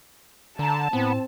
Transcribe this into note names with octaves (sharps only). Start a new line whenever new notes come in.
D3 A5 A#5
A2 B3 C4